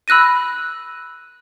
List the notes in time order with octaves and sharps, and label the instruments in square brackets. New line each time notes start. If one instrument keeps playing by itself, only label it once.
[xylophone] B5 E6 F#6 A#6 D#7